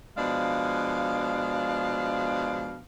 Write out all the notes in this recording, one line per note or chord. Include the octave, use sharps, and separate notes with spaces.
B2 F3 G#3 D4 F5